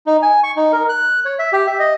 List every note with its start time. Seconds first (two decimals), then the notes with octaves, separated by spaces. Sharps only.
0.07 D#4
0.22 G#5
0.43 C#6
0.57 D#4
0.73 A#4
0.89 F#6
1.25 C#5
1.39 E5
1.53 G4
1.67 E5
1.79 D#5